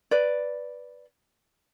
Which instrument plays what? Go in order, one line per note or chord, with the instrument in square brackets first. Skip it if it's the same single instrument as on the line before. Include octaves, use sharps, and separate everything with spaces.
[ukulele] B4 D5